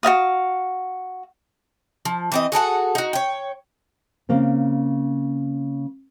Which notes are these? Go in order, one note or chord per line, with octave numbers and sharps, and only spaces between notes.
F#4 D#5 F5 D#6
F3
E3 C4 D#5
F#4 G#4 A4 F#5
D#4 F#4
C#5 G5
C#3 A#3 C4